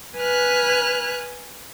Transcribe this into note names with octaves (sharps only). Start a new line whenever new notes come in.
B4 G#5 F6 F#6